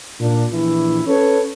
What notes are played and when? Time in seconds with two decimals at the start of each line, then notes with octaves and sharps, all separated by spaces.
0.20 A#2 A#3 D4
0.52 A#1 E3 E4
1.06 C#4 A4 B4 C#5